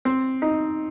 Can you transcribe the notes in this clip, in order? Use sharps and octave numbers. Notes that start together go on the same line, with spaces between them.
C4
D#4